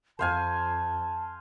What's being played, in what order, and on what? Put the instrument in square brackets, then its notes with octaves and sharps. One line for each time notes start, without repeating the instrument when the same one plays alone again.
[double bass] F2 [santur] C5 F5 G#5 [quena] A5